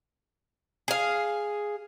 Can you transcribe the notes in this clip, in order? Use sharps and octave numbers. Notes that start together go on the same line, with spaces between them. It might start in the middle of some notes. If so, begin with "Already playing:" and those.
G#4 F5